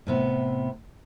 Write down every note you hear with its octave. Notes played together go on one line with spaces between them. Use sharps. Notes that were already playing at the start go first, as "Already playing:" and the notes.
A2 C3 B3